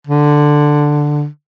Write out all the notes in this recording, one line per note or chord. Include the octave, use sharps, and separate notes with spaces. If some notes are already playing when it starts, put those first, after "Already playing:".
D3